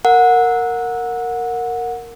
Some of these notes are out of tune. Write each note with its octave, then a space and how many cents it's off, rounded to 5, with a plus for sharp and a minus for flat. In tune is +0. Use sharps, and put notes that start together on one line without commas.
A#4 -10 F#5 -20